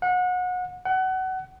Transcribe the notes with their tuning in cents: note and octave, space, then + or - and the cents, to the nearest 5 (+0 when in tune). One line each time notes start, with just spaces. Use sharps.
F#5 -30
F#5 +25